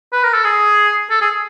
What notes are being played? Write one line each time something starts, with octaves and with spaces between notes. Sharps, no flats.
B4
A#4
A4
G#4
A4
G#4